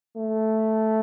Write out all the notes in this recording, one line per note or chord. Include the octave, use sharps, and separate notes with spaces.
A3